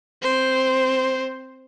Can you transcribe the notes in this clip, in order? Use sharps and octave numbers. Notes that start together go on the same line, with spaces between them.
C4 C5